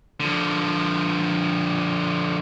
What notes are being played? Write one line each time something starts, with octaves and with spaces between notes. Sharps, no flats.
D3 F3